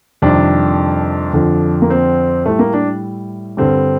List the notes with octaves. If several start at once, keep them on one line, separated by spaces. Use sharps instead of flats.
F2 C3 D#3 G3 D4
F2 D3 F3
A#3
C4
A2 G3 A3
A#3
D4
G2 D3 G3 C4